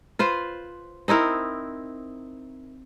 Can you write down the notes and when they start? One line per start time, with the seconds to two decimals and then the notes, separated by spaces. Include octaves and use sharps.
0.19 F4 B4 C5
1.08 C4 D#4 E4 A#4